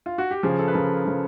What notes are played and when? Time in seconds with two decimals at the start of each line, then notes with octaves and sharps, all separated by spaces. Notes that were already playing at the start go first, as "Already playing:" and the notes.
0.06 F4
0.18 F#4
0.31 G4
0.43 C#3 F3 G#4
0.59 A4
0.68 B4
0.74 C#3 F3 A#4
1.04 C#3 F3